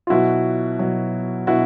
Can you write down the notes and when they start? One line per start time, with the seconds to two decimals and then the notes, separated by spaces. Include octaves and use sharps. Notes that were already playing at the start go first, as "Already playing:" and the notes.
0.07 F4
0.10 B2 F#3 E4 F#4
0.79 B2 F#3
1.47 B2 E4 F#4